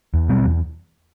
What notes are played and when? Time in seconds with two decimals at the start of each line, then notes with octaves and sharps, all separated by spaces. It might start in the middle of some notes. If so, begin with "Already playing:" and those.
0.14 E2
0.29 B2 G3 C4
0.44 E2